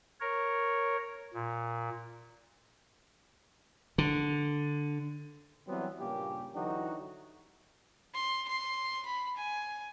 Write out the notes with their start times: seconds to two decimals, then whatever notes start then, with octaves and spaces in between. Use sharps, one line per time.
0.20 A#4 C#5
1.34 A#2
3.98 D3
5.68 E3 F#3 G3 B3 C4
5.99 G2 A#2 C#3 A#3 C#4 G4
6.54 D3 E3 F#3 D#4 F#4 G4
8.14 C6
8.48 C6
9.05 B5
9.37 G#5